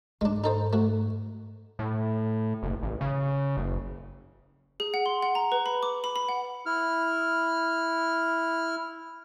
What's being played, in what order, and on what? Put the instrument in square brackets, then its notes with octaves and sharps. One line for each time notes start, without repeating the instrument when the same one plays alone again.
[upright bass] G#2 [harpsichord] G#3 D4
[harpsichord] D#4 A4 C5
A3 F#4
[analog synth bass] A2
F#1
A1
C#3
F#1
[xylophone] G#4
F#5
C6
F#5
A#5
B4
B5
D6
B5
B5
F#5
[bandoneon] E4 F6